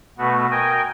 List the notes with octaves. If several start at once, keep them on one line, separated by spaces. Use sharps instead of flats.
B2 A3 B3 F#4
A#4 D#5 G5 G#5